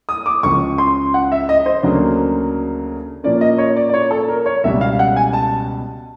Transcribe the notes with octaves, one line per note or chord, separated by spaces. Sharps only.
D#6
D6
C#2 C#3 F3 C#6
C6
F#5
E5
D#5
C5
D2 C#3 F#3 A#3 D4
A#2 F3 A#3 C#4 D5
D#5
C#5
D5
D5
C#5
A4
A#4
C#5
C#2 B2 G3 E5
F5
F#5
G#5
A5